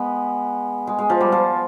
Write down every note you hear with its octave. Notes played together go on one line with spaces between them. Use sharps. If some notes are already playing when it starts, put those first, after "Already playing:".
Already playing: G#3 B3
G#3
G#3
F3
G3
F3